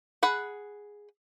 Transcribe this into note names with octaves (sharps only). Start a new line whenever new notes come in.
G#4 F#5 B5